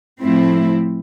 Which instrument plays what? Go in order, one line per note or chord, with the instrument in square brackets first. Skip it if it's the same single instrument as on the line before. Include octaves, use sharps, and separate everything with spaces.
[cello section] A2 F3 A3 C4 E4